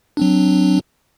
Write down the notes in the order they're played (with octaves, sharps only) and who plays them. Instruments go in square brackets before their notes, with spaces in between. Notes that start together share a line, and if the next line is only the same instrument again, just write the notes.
[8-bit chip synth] F#3 C4 D4